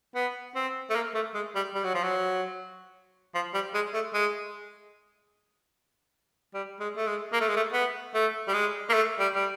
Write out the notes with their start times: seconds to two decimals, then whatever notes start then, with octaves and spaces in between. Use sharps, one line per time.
0.15 B3
0.55 C4
0.90 A3
0.95 A#3
1.14 A3
1.34 G#3
1.55 G3
1.75 G3
1.84 F#3
1.94 F3
2.03 F#3
3.35 F3
3.54 G3
3.74 G#3
3.94 A3
4.14 G#3
6.54 G3
6.80 G#3
6.97 A3
7.07 G#3
7.33 A#3
7.41 A3
7.49 G#3
7.56 A3
7.73 B3
8.14 A3
8.48 G3
8.54 G#3
8.90 A#3
8.94 A3
9.19 G3
9.35 G3